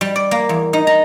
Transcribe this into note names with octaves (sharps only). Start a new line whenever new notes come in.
G3
D5
A#3
E2
D#4
A#5